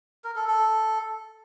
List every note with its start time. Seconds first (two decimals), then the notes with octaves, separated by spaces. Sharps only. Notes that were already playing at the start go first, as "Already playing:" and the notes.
0.24 A#4
0.36 A4
0.47 A4